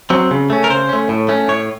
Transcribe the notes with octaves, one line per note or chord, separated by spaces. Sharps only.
F#3 C4
C#3
A3 C#4
A#4
C#3 C5
A3 C#4
A2
A3 C#4
A2 C#5